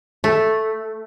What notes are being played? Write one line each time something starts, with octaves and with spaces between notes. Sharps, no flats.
A3